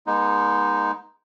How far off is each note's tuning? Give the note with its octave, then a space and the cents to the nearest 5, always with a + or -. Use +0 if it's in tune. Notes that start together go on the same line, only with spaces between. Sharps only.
G#3 +0 B3 -40 D#4 +5